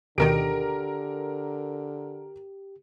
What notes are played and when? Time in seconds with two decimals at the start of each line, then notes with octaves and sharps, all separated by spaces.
0.18 D2 B2 D3 D#3 G4 A#4 D7